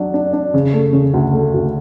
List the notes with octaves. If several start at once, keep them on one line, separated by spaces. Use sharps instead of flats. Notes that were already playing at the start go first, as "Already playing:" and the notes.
Already playing: F#3 D4
D4
D4
C#3
A3
C#3
D2
A3
D2